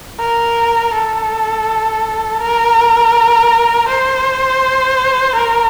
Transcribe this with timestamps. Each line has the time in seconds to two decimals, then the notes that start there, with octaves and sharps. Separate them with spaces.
0.19 A#4
0.94 A4
2.41 A#4
3.88 C5
5.35 A#4